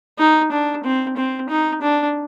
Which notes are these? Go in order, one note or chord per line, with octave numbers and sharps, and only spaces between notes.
D#4
D4
C4
C4
D#4
D4